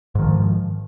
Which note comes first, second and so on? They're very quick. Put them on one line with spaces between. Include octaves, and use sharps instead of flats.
G#2 D#3 F3